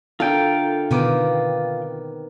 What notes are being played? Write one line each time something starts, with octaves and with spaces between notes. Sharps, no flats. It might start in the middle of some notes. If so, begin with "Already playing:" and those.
D3 E4 F4 A4 A#4 G5
B2 D3 D#3 B3 C4 D6